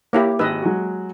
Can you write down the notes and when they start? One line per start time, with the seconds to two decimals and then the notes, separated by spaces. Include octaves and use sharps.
0.13 A#3 E4 G4 C#5 F5
0.39 G#1 B4 D#5 E6
0.62 F#3 G#3 F#4